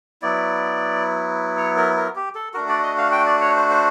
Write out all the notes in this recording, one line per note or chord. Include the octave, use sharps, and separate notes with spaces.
F#3 B3 E4 D5
C#5
A#4
A#4
G4
A4
A3 D4 F#4 A#4
D5
D#5
F5
G5
D5
C#5
C5
C5